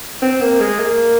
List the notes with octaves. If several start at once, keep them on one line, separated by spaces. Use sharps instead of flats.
C4
A#3
G#3
A#3